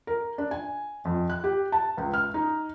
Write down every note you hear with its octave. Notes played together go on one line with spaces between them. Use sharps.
A#4
D4
G#5
F2
F#6
G4
A5
C#2
F6
D#4